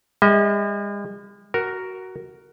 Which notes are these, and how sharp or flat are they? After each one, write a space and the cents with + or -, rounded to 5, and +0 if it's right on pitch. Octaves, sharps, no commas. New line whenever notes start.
G#3 -45 D#5 +45
F#4 +10 A#4 +0